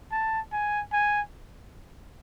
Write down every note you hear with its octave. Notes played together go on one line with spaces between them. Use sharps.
A5
G#5
G#5